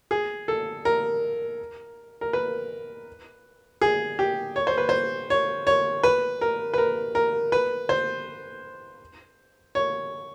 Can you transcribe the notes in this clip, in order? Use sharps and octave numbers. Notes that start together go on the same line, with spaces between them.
G#4
A4
A#4
A#4
B4
G#4
G4
C#5
C5
B4
C5
C#5
C#5
B4
A#4
B4
A#4
A#4
B4
C5
C#5